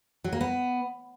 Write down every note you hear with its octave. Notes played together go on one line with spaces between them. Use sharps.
F#3
A#3
B3